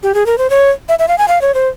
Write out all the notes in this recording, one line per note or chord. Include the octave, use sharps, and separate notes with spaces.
G4
G#4
A#4
C5
C#5
E5
E5
F5
G#5
F5
C#5
C5